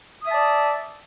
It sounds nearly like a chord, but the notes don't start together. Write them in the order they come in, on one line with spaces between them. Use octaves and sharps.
D#6 E5 A5 D5